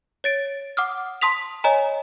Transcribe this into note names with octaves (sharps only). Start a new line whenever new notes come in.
C#5 A6 D7
F#5 D6 D#6 F6
A5 C6 D#6 B6 F7
C#5 D#5 G#5 A#5